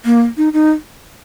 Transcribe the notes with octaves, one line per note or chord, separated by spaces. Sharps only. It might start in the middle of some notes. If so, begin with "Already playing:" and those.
A#3
D#4
D#4